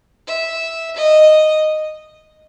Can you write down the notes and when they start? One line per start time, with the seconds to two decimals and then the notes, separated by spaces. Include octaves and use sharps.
0.27 E5
0.96 D#5